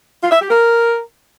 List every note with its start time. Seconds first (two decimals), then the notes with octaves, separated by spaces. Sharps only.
0.22 F4
0.31 E5
0.40 G4
0.49 A#4